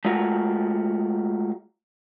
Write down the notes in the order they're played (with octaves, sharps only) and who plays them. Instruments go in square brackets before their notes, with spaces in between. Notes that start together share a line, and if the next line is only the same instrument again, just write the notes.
[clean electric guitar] G#3 A3 F4 F#4 A#4